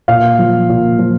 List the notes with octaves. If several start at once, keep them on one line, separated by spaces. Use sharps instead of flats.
A#2 F5
F3
A#2
F3